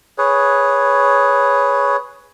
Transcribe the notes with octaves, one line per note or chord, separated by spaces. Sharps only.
G#4 B4 C#5